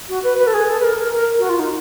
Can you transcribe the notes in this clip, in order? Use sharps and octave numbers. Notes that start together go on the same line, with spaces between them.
F#4
B4
B4
A4
G#4
A4
B4
A#4
A#4
A#4
F#4
F4
D#4